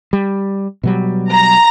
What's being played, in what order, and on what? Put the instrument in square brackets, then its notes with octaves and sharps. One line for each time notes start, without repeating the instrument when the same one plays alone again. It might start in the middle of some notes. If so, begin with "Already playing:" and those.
[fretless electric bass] G3
B2 F#3 G3
[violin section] A#5